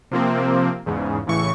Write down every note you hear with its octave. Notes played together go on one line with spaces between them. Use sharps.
C3 F3 A#3 C4
E2 G#2 C#3
A1 A2 C#3 E3 C#6